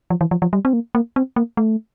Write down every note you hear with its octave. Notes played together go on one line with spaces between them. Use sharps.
F3
E3
F3
F3
G3
C4
A#3
A#3
C4
A#3
A3